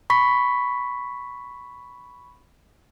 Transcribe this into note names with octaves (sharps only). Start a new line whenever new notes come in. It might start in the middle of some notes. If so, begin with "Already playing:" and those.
B5 C#6 B6